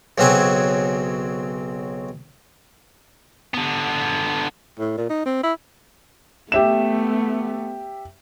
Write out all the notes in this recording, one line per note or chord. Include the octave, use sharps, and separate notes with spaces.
B1 C#3 F#3 C4 F#5 G#5
D3 B3
A2
A#2
D#4
C4
E4
A3 B3 G4 E5 E7